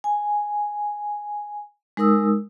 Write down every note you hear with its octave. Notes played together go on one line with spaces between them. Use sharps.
G#5
G#3 D#4 A#4 D#6 E6